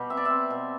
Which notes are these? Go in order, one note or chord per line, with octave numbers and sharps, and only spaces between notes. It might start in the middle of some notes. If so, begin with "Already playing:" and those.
Already playing: B2 G3
C4 E5
D5
E5
C4
B2